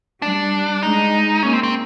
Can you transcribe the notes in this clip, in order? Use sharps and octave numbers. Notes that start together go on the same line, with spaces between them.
G3 D4
G#3 D#4
A#3 C#4
C4
C4